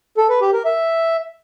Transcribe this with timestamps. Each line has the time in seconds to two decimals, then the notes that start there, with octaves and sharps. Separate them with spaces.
0.17 A4
0.29 B4
0.41 G4
0.53 A#4
0.65 E5